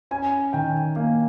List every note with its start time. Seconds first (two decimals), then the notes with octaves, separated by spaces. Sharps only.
0.11 C#4 G#5
0.53 D#3 G5
0.96 A#3 F5